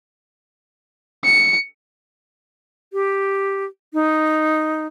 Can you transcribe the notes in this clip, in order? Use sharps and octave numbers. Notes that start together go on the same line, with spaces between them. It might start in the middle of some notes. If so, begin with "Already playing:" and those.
C#7
G4
D#4